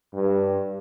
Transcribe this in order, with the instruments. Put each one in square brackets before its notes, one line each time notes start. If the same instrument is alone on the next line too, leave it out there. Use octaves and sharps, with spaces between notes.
[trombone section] G2